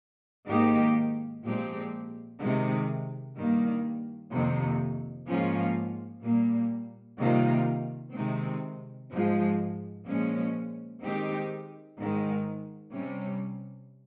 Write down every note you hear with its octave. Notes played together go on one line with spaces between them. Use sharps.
G#2 D#3 A#3 D#4 G4
A#2 F3 G#3 C4 G4
C3 D#3 G#3
G2 D#3 G3 A#3
F2 C3 D#3 A#3
G#2 F3 A#3 C#4 F4
A#2 G3 A#3
C3 D#3 G3 A#3 F4
C3 D#3 G#3 C4
G#2 F3 G#3
A#2 F3 G#3 C#4
D#3 G#3 C4 D#4 G4
G#2 D#3 G#3
C3 G3 C#4